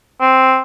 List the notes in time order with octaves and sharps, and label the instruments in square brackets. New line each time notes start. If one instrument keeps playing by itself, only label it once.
[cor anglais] C4